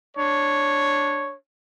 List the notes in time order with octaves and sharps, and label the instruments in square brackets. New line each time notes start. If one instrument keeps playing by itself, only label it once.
[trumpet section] D4 C#5